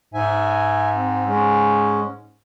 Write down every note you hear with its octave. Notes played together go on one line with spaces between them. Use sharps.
G#2 E5 G#5
C4
G#3 C#4